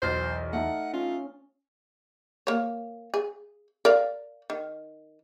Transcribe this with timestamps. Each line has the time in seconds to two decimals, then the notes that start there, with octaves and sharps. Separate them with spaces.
0.02 B1 E2 C5 F6 A6
0.53 A3 D#4 F#5
0.93 C#4 F4
2.47 A#3 C#5
3.14 G#4
3.85 A#4 D5 F5
4.50 D#3